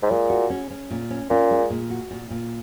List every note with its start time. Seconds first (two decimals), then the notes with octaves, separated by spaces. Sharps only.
0.02 G#2
0.11 A#2 G#3
0.30 F#4
0.50 C#4
0.70 C#4
0.90 A#2
1.10 C#4
1.30 A#2 C#4
1.51 G#3
1.70 A#2
1.90 F#4
2.11 A#2
2.30 A#2